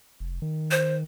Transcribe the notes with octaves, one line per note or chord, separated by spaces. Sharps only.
F1
D#3
C5